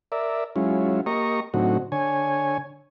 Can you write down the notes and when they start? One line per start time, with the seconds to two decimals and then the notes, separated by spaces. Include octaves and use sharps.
0.12 A#4 D5 E5
0.56 F#3 G#3 C#4 E4 F4
1.06 A#3 G4 D#5 A#5 C#6
1.54 A2 D3 F#3 C4 D#4 F#4
1.92 D3 C#5 G#5